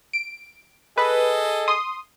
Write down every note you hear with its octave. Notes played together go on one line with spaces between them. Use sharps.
D7
G#4 A4 B4 D#5
C6 D#6